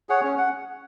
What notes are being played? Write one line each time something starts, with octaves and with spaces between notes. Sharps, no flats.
G#4 C#5 F#5
C#4
F#5